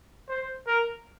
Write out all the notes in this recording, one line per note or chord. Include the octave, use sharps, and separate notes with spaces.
C5
A#4